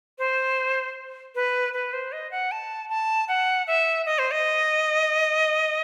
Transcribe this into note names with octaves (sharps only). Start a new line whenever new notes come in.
C5
B4
B4
C5
D#5
F#5
A5
A5
F#5
E5
D#5
C5
D#5